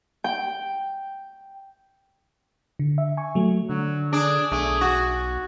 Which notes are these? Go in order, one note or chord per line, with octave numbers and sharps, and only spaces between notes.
G5
D3
E5
G#5 C#6
F#3 A3
D3 F#3
D4 G#4
B1 A3 G#4
F#4